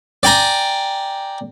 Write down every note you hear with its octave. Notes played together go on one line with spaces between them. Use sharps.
D5 G5 G#5 A#5